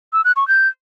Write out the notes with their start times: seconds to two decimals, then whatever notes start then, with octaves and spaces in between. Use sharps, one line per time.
0.13 E6
0.24 F#6
0.36 C#6
0.48 G6